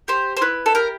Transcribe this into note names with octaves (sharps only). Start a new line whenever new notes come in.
G4 C5
C5
E4 B4
A4
G4 A#4